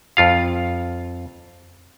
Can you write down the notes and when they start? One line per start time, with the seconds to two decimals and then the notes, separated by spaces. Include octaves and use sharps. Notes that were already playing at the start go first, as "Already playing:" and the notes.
0.17 F2 F4 F5